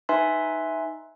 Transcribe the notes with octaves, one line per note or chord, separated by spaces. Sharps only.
D#4 B4 E5 G#5 C6